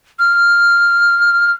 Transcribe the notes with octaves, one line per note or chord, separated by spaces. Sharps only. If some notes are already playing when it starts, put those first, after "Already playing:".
F6